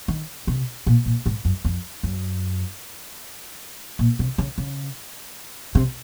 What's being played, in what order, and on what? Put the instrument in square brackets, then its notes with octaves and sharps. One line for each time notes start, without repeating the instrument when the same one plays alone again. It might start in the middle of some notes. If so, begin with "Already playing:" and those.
[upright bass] D#3
C3
A#2
A#2
G#2
F#2
F2
F#2
A#2
C3
C#3
C#3
C3